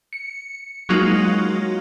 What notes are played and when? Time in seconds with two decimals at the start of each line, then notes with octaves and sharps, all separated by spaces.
0.13 C#7
0.89 F#3 G#3 A#3 D#4 F4 F#4